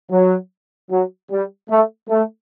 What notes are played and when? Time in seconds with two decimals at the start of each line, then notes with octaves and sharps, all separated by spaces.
0.11 F#3
0.90 F#3
1.31 G3
1.70 A3
2.09 A3